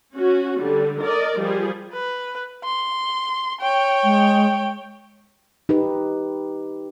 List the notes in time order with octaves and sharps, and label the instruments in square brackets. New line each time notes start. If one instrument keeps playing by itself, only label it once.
[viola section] C#4 F#4
D3 G3
A#4 D5 D#5
F3 G3 G#4
[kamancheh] B4
C6
C#5 G5
[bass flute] G#3
[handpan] D#4 G4 B4